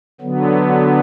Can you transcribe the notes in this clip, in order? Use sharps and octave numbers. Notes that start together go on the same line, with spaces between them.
D3 F#3 B3